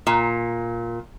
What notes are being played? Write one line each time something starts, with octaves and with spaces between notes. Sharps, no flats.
A#2